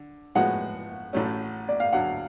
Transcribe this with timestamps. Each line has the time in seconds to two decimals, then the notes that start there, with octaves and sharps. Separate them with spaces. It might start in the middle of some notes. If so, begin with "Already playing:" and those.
Already playing: D3
0.35 A2 F3 G#3 B3 F#4 F#5
1.13 A1 A2 F#3 A3 C#4
1.69 D5
1.80 F5
1.93 D2 D3 F#3 F#5